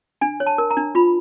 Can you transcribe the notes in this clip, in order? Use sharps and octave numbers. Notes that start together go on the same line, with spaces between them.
D4 G#5
C#5
A5
A#4
A#5
D4
F4 B5